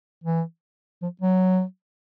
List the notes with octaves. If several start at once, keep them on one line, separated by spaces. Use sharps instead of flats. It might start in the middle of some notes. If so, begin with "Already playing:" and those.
E3
F3
F#3